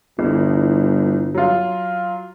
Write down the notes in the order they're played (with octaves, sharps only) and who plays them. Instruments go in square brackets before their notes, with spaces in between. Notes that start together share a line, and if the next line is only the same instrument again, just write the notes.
[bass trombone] G1 [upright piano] C2
[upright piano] F#3 F4